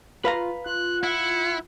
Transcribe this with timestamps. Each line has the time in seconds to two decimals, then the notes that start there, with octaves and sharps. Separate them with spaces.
0.25 F4 B4 F5 A#5
0.66 F4 F#6
1.03 E4 F#5